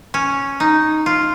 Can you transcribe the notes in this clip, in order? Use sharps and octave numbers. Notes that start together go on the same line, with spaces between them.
C#4
D#4
F4